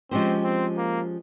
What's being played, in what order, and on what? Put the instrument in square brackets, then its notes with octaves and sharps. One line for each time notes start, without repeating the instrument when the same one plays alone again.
[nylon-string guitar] F3 G#3 C#4 G4 C5 [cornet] C4
[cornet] C4
A#3